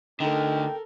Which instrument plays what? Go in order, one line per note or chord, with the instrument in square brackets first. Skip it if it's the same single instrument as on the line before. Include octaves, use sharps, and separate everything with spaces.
[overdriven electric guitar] D2 D3 [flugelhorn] D#4 [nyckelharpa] A4 A#4 [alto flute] G5